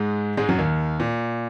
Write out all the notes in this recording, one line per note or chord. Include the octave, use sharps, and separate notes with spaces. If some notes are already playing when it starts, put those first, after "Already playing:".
Already playing: G#2 G#3
G#2 G#3
F#2 F#3
D#2 D#3
A#2